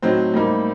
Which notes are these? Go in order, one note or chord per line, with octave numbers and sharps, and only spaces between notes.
A2 F#3 C4 D#4 C5
A2 G3 A#3 D#4